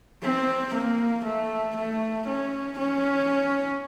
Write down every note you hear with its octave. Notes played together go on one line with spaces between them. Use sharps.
C4
A#3
A3
A3
C#4
C#4